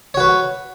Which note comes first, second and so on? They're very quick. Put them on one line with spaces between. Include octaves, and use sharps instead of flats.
C#5 F#4 B4